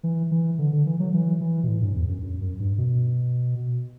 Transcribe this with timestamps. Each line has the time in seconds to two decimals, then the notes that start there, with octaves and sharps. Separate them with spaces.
0.03 E3
0.31 E3
0.59 D3
0.73 D3
0.86 E3
1.00 F#3
1.14 E3
1.41 E3
1.63 B2
1.68 A2
1.82 G2
1.95 E2
2.09 F#2
2.23 F#2
2.41 F#2
2.60 G2
2.78 B2